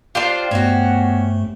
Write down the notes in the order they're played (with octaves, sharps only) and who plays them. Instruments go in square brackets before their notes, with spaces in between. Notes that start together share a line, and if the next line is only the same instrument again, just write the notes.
[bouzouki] D4 F4 [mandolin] G4 C5
[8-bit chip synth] G2 A3 [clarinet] B3 [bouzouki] C#4 F#4